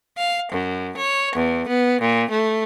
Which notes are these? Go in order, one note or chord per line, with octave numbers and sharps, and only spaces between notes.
F5
F#2
C#5
E2
B3
A#2
A3